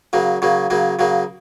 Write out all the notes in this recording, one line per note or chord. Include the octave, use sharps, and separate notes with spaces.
C#3 F#3 A#3
C#3 F#3 A#3
C#3 F#3 A#3
C#3 F#3 A#3